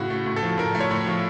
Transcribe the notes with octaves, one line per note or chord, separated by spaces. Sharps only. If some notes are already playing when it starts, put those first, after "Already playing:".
Already playing: A2 C#3 F#4
A3
A2
A4
F3
A2 A#4
A3
C#5
A2
F3